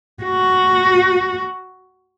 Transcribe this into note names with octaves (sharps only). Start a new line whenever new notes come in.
F#4